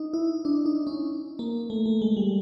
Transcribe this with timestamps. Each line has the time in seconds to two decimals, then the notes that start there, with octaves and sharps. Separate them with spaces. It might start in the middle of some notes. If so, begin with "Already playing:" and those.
Already playing: D#4
0.14 E4
0.45 D4
0.66 D#4
0.87 C#4
1.39 A#3
1.70 A3
1.86 A3
2.02 G#3
2.17 G3